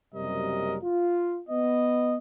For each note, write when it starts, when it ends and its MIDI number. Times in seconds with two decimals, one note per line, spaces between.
0.14 0.78 30
0.14 0.78 42
0.14 0.78 48
0.14 0.78 55
0.14 0.78 70
0.14 0.78 75
0.83 1.39 65
1.49 2.16 59
1.49 2.16 75